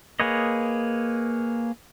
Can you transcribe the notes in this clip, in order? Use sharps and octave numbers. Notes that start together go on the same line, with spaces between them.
A#3 G#4 B4 C#5 D#5